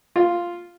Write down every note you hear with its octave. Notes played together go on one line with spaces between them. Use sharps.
F4